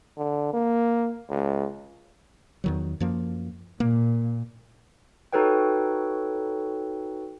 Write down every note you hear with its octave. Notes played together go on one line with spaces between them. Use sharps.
D3
A#3
C#2
E2 D#3 F#3
F#2 F3 A#3
A#2 A#3
D#4 F#4 A4 B4 C#5 G5